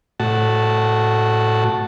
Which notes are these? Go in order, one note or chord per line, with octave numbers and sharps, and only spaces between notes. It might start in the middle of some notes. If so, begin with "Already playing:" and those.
A2 F#4 A5